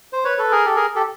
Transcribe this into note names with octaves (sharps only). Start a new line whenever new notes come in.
C5
B4 C#5
A4 B4
G#4 A#4
G4 A4
G#4 A#4
G4 A4